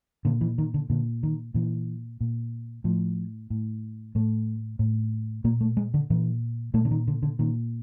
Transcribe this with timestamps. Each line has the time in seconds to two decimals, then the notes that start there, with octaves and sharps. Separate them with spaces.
0.25 A#2 D3
0.41 E3
0.58 D#3
0.74 D3
0.90 A#2 D3
1.23 D#3
1.54 A#2 E3
2.21 A#2
2.84 A2 F3
3.50 A2
4.15 A2 A3
4.79 A2
5.44 A#2 A#3
5.61 A3
5.77 G#3
5.94 D3
6.10 A#2 E3
6.74 A#2 A3
6.85 D3
6.91 D#3
7.08 D3
7.23 D3
7.39 A#2 D#3